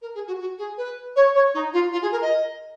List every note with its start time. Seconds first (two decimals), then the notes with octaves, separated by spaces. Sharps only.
0.01 A#4
0.14 G#4
0.27 F#4
0.39 F#4
0.58 G#4
0.77 B4
1.16 C#5
1.34 C#5
1.54 D#4
1.73 F4
1.92 F4
2.02 G#4
2.11 A#4
2.21 D#5